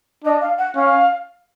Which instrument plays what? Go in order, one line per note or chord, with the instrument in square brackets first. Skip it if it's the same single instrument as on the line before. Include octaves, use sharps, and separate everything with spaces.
[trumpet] D4 [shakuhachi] D#5
[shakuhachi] F5
F#5
[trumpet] C#4 [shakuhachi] F5